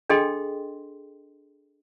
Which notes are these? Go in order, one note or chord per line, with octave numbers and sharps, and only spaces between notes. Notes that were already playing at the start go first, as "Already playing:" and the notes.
D4 G#4 A4 D#5 G5 C6